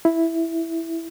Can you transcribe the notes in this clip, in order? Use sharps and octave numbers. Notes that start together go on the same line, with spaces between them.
E4